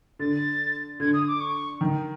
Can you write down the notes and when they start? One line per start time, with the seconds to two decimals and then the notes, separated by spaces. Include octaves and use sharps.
0.19 D3 A6
1.00 D3 G#6
1.13 D#6
1.28 D6
1.40 C#6
1.81 D#3